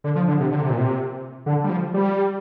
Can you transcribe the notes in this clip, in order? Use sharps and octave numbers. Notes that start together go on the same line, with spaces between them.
D3
F3
D3
C3
D3
C3
A#2
C3
D3
G3
F3
G3